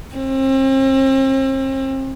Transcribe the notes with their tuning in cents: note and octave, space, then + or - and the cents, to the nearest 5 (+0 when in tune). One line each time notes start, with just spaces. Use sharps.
C4 +40